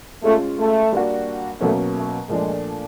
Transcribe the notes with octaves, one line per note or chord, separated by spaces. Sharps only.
G#3 A3 C#4 F4
A3
G3 A#3 D4 F#4
B2 F#3 A3 A#3 C#4
A3
A#2 F3 G#3 A3 D4